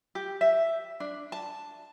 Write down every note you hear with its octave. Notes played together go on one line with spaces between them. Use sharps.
G4
E5
D4
A5